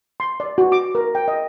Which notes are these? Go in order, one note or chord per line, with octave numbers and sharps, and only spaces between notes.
C6
D5
F#4
D6
A#4
G5
D#5